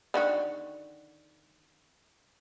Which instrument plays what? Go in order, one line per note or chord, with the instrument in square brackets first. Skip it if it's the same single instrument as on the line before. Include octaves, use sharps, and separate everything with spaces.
[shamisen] D3 D#3 F#4